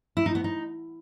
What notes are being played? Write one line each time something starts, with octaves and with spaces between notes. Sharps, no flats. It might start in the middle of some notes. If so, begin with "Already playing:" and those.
E4
D#4
B3
D#4